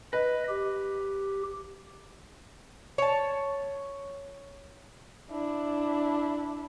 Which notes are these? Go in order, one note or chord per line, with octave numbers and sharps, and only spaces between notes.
B4 D#5
G4
C#5 A5
D4 E4